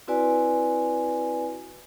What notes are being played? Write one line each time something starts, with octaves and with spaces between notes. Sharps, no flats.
C4 E4 F#4 B4 D5 G#5